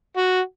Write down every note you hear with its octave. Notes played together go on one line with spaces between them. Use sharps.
F#4